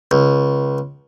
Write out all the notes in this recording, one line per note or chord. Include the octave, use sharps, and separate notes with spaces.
C#2